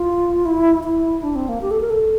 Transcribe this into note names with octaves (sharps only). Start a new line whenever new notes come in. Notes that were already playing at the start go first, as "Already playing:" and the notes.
Already playing: F4
E4
E4
D4
C4
A#3
G4
A4
A#4
A4